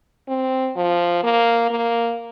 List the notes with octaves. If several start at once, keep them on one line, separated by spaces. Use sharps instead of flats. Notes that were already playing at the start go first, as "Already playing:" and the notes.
C4
F3
A#3
A#3